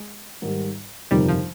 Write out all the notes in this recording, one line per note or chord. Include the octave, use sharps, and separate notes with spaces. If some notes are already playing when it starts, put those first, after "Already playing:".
Already playing: G#3
G#2 D#3 G3
G1 F2 C3 D#3 G3
F3